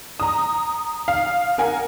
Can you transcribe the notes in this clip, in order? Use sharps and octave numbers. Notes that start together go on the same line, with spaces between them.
A#5 D#6
F5
A#4 F#5 G#5